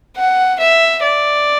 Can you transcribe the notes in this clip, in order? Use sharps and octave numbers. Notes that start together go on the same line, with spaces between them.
F#5
E5
D5